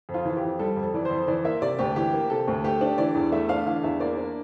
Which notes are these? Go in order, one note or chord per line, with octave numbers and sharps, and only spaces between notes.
F2
F4
E3 F4
G4
F2
G3 A4
F2
A4
E3 D5
F2 C5
E3 D5
A#3 E5
C3 D5
D2 G4
E3 G4
A#3
C3 A4
D2
A3 G4
D4
E3 D5
E2
A3 E5
D4 F5
E3 F5
E2 E5
A#3 D5
D4